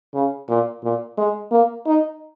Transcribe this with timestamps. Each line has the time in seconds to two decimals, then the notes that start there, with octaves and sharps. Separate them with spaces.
0.14 C#3
0.49 A#2
0.83 A#2
1.17 G#3
1.52 A#3
1.87 D#4